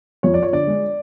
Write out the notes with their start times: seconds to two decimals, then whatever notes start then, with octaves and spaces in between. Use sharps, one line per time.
0.23 F2 C#5
0.34 D5
0.39 F3 C#5
0.53 D3 D5
0.67 G#3